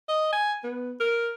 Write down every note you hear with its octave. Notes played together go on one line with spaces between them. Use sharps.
D#5
G#5
B3
A#4